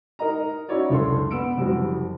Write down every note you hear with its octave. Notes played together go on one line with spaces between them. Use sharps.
D#4 A#4 D#5 A#5
C#4 D#4 E4 F#4 C#5 D5
F#1 C#2 D4 A4 C6
B3 E6 D7
F#1 F2 G3 F#4